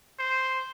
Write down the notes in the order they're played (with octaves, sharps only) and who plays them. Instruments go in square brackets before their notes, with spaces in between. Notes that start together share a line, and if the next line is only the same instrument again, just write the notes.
[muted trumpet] C5